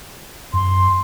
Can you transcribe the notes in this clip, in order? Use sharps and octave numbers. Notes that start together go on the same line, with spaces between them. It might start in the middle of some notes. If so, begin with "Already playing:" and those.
F#2 C6